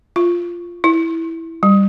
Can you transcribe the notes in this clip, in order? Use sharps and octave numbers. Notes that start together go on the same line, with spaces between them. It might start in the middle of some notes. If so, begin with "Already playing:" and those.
F4
E4
G3